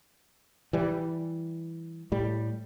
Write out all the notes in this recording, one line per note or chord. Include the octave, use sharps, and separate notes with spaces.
E3 G3
A2 G3